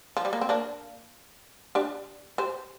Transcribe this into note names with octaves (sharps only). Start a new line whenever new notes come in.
F3
G3
A#3
C4
A#3 D4
D4 G4
G4 C5